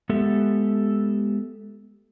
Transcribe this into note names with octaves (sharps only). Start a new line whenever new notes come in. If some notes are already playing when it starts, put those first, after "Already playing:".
G#3 B3 G4 A4 E5